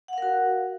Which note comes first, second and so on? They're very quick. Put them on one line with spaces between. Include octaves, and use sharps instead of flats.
F#5 F5 A#4 F#4